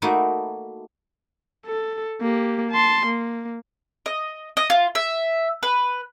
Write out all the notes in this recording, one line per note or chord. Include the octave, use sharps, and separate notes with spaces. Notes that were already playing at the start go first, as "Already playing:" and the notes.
A3 A#3 D#4 E4 F#4
A4
A#3 G4
A5 C6
A#3
D#5
D#5
F4
E5
B4